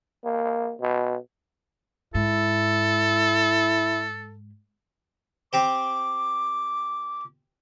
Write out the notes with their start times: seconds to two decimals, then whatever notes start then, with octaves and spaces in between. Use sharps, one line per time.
0.24 A#3
0.81 B2
2.15 G#2 E4 A4
5.53 C4 G4 C5 D6